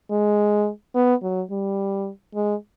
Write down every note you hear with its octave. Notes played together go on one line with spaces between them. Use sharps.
G#3
B3
F#3
G3
G#3